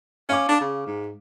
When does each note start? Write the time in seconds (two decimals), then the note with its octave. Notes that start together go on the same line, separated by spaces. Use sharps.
0.29 C#4 F5 D6
0.49 D4
0.61 C#3
0.87 G#2